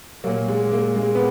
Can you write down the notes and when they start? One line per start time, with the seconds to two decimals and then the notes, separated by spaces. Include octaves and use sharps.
0.24 A#2 F#3 A#3
0.48 G#3
0.72 A#3
0.96 G#3
1.15 B3